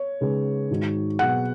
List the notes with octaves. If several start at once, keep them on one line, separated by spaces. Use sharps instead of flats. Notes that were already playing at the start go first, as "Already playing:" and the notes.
Already playing: C#5
C#3 G#3 D#4 G#4 B4
G#2 D#3 G#3 D#4 F#4
B2 F#3 B3 G#4 F#5